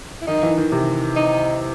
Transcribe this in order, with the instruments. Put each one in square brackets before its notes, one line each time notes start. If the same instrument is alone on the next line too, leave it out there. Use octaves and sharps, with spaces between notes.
[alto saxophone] E4
[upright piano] D#3 [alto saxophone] D#4
[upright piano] E3
D#3
C3
[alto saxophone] D#4